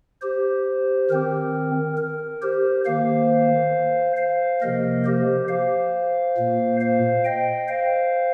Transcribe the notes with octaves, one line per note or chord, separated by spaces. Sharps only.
G4 C5
D#3 C4 A#4
A#4
G4 C5
D#3 A#3 C5 F5
C5 F5
C3 F3 A#3 A#4 D#5
G4 C5
C5 F5
A#2 A#3
C5 F5
D#5 G5
C5 F5